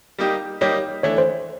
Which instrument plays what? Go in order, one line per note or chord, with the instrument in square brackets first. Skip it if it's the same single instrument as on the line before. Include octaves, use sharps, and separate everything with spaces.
[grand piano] G3 A#3 D#4 G4
[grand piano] G3 A#3 D#4 G4 [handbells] C#5
[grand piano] E3 A3 D4 [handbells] C#5
[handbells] C5